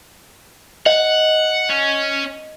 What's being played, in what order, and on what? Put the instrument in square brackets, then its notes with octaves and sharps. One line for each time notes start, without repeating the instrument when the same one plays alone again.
[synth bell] D#5 [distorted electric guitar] F#5
[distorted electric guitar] C#4